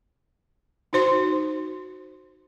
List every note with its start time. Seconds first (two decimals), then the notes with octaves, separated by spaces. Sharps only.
0.93 D#4 F#4 C5 C6